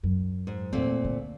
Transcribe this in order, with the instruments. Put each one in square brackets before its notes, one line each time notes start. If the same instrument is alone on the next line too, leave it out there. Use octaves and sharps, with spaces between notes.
[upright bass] F#2
[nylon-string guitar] G#2
[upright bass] E2 [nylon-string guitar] A#2 A3 C4
[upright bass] D3